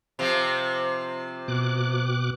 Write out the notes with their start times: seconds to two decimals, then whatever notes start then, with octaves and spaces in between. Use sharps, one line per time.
0.19 C3 F3
1.48 B2 D6 F#6